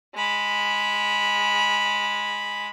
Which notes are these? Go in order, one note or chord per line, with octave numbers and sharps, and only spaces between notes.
G#3 B5